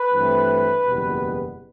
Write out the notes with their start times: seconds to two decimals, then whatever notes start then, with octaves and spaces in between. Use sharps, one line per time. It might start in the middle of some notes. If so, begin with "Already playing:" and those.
Already playing: B4
0.10 G2 E3 A3 C4
0.86 F#1 E2 B2 G3 B3